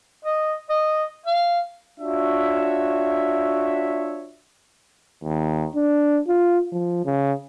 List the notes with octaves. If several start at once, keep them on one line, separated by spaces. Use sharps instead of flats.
D#5
D#5
F5
D4 F4 F#4 C#5 E5
D#2
D4
F4
F3
C#3